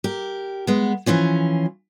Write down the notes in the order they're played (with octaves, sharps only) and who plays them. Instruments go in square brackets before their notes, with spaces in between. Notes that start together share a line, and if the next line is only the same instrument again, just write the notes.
[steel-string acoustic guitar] G4 A#4
G#3 B3
E3 F3 C#4 F4